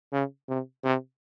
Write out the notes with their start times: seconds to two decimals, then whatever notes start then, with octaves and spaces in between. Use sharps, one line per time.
0.12 C#3
0.49 C3
0.84 C3